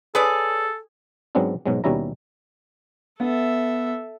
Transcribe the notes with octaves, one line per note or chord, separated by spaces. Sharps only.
G#4 A4 B4 C#5 D5
G#2 F#3 G#3 B3 C4 D4
G#2 B2 F#3 G#3
D#2 B2 G3 C#4 E4 A#5
B3 A4 E5